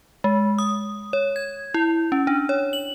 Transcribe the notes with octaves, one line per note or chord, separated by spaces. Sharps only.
G#3
D#6
C#5
G#6
E4
C#4
D4
C#5
F#7